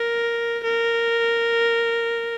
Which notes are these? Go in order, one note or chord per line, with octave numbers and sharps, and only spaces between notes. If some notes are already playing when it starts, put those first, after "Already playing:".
Already playing: A#4
A#4